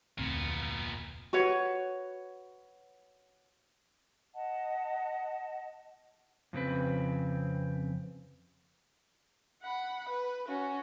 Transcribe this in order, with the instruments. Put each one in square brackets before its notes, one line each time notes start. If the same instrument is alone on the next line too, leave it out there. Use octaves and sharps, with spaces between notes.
[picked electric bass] F1 D2 C4 [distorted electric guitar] A#2 B3
[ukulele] F#4 B4 C#5
[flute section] D#5 F#5 A5
[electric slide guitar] F2 C#3 C4 B4
[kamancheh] F#5 B5
B4
C#4 F#4